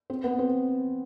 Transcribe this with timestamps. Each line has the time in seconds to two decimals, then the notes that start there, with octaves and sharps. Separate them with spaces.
0.10 C4
0.24 B3
0.39 C4